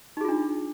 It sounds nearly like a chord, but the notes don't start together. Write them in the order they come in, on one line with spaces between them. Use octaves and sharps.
D#4 G#4 F4 D4